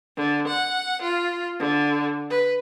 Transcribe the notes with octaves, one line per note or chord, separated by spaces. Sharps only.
D3
F#5
F4
D3
B4